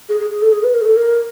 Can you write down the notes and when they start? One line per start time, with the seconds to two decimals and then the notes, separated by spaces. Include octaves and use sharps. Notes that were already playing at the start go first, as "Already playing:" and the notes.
0.09 G#4
0.20 G#4
0.30 G#4
0.42 A4
0.52 G#4
0.63 B4
0.74 A#4
0.81 G#4
0.85 A4
0.96 A#4